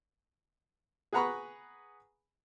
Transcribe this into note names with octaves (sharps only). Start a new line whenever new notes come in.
G#4 B4 F#5 A#5 B5 C#6